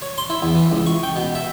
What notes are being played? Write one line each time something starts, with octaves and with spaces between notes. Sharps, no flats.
C#5
C6
E4
E2
E3
C#2
C#6
G5
B2
E5